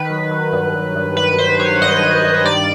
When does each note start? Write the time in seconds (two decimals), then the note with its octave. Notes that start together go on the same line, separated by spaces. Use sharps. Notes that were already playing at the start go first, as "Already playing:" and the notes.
Already playing: D#3 B4
0.10 F#3
0.31 F#3
0.52 G2
0.74 G2
0.95 G2
1.17 G2 B4
1.38 G2 C5
1.60 F#3 C#5
1.82 G2 D#5
2.03 G2
2.24 G2
2.45 D#3 D5